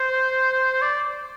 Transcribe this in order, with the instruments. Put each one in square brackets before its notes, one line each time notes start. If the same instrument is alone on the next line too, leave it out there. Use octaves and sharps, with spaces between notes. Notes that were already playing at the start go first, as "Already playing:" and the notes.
Already playing: [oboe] C5
D5